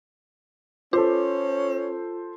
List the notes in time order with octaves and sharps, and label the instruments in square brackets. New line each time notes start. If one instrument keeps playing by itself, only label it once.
[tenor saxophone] C#4 [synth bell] F4 [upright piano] A4 C5